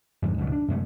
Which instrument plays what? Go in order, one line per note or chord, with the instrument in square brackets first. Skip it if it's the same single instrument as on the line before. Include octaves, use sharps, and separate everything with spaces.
[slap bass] F2 G#2 D3
C#2 G#2 B2 F#3
D4
F#2 C3 G#3 A3